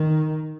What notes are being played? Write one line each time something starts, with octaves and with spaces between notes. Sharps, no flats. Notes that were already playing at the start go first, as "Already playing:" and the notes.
Already playing: D#3